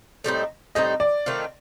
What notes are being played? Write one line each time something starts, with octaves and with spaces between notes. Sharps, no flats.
A2 G3 C4 D#4
A2 G3 C4 D#4 D#5
D5
D#3 A3 C4 F4